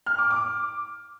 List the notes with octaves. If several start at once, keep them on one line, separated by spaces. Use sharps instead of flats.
F6
D6
D6